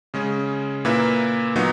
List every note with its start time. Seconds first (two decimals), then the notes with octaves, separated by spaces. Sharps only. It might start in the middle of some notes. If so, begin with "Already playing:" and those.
0.14 C#3 G#3 C#4 G#4
0.85 A#2 A#3 E4 B4 E5
1.55 A#2 F#3 B3 D#4